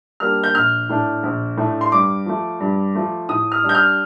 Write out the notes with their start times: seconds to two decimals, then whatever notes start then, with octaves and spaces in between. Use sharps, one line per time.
0.20 G3 A#3 D4 F6
0.44 G6
0.55 A#1 F6
0.89 A2 A3 D4
1.23 A#1
1.57 A2 A3 D4
1.81 C6
1.92 G2 D6
2.26 F3 A3
2.60 G2
2.95 F3 A3
3.29 A2 D#6
3.52 F6
3.63 G3 D4
3.69 G6
3.75 F6